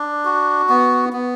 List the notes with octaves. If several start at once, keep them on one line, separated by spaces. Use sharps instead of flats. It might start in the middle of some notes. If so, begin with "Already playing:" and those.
Already playing: D4
F#4
B3
B3